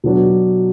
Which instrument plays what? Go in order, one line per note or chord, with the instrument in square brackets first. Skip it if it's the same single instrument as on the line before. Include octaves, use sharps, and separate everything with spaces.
[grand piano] B2 F#3 B3 D4